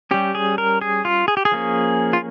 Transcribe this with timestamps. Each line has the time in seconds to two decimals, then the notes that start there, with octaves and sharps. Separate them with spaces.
0.11 G3 C#4 G4
0.35 G#4
0.58 A#4
0.81 G#4
1.05 F4
1.28 G#4
1.37 G4
1.45 G#4
1.52 F3 A#3 C#4
2.13 F4